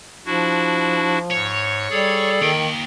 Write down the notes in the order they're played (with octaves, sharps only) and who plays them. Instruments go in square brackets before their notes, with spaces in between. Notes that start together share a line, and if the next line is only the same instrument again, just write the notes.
[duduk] F3 [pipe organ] D4 E4 F#4
[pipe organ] G#2 [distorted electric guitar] C#5
[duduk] G3 [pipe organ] G#4 A4 D5
[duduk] D#3 [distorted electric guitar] A#3 G5